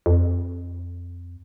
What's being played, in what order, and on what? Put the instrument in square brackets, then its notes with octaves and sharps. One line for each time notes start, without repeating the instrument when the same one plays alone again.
[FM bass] F2